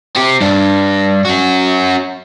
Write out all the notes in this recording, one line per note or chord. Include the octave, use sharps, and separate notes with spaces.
C4 G4
G2 D4
C#4 F#4